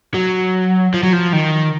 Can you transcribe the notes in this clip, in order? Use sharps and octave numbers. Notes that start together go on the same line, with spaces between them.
F#3
F3
F#3
F3
D#3